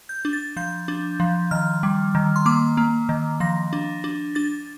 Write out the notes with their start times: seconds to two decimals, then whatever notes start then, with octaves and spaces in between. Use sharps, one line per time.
0.09 G6
0.25 D4
0.33 A6
0.57 F3 G6
0.88 D4
1.20 F3
1.51 D#3 F6
1.83 G3
2.15 D#3
2.36 C6
2.46 A#3 D6
2.77 A#3
3.09 D#3
3.40 F3 A#6
3.73 D4
4.04 D4
4.35 D4 A6